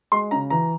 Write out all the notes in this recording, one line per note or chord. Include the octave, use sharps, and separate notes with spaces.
G#3 C6
C#3 A#5
E3 A#5